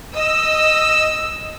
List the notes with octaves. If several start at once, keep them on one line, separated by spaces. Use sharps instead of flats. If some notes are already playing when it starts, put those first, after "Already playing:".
D#5 E6